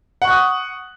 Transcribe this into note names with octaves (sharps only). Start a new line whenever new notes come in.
F#5 C#6 D#6 F#6